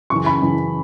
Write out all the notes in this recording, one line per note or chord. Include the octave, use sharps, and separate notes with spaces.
F#2 C#3 E3 C#6
B5
F#2 C#3 E3